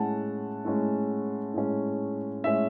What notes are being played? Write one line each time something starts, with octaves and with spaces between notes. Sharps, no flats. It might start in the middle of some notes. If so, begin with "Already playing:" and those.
Already playing: A2 G#3 C#4 F#5 A5
A2 G#3 C#4
A2 G#3 C#4
A2 G#3 C#4 E5